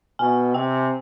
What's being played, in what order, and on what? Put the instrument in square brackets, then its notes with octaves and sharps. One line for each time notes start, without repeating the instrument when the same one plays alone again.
[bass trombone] B2 [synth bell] G#5
[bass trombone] C3 [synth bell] G5